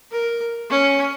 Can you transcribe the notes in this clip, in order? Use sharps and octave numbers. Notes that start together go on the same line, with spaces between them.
A#4
C#4